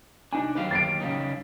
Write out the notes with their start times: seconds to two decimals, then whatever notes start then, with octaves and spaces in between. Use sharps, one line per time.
0.33 C2 D4 D#4 G#5
0.55 D#2 F#3 G4 B4 F5
0.71 A6 C7 D7
1.00 C#3 G3 D#4